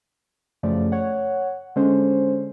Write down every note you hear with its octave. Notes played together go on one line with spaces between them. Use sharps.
F#2 C#3 F3 A3 D5
C#5 F#5
D3 G#3 C#4 C5